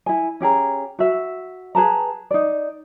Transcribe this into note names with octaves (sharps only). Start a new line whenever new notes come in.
E4 G#5
C#4 G4 G#4 A#5
F#4 E5
G#4 B4 A5 A#5
D#4 D5